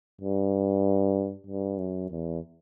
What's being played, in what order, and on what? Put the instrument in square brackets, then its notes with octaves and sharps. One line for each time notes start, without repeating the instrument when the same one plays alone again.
[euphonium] G2
G2
F#2
E2